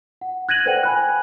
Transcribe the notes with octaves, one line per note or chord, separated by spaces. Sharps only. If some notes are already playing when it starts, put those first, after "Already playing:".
F#5
F#6 G#6 A#6 D#7 F#7
A4 B4 C5 D5 F#5 G5
G#5 B5 F#6